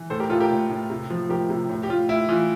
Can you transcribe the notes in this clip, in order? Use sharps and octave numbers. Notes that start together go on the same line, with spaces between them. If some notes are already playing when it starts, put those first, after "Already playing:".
Already playing: E3
A2 A4 C5
G4 A#4
A2 F4 A4
G4 A#4
A2
A2
C3
F3
F3 G4 A#4
C3
A2
G4
A2 F4
A2 E4
E3 F4